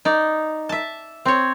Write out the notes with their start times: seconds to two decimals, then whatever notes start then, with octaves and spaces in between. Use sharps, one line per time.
0.05 D#4 D5
0.69 E5 A5
1.25 C4 C#5